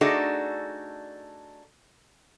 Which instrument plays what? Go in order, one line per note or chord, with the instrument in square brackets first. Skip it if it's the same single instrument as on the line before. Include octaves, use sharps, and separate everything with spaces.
[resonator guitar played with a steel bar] A3 D4 D#4 F#4 G#4 A4